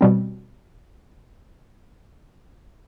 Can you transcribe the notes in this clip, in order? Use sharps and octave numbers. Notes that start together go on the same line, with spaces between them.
B2 G3 C4